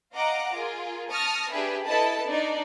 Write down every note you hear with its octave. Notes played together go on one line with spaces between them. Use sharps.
D#5 F5 F#5 A#5 D6
F4 G#4 A#4
A5 C#6 D#6 F6 A#6
D4 G4 G#4 B4 E5
E4 A4 B4 D#5 A5 B5
D4 D#4 D5